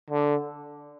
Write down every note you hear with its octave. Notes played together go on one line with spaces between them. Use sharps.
D3